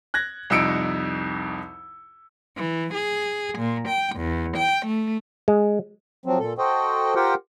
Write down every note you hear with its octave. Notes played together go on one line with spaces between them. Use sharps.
F#6 G#6 A#6
C2 F2 D#4 E6 C#7 D7
E3
G#4
A#2
G5
E2
G5
A3
G#3
F3 F#3 C4
A#2 A4
F#4 A4 C5 D#5 G5
F4 G4 A#4 C5 F#5 G5